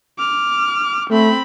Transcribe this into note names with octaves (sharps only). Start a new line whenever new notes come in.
D6 F6
A3 C4 B5